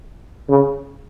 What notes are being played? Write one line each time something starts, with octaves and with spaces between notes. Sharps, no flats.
C#3